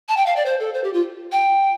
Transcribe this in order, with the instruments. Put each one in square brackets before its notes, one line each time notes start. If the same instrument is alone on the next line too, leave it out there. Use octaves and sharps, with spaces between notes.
[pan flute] A5
G5
F5
D5
C5
A4
C5
G4
F4
G5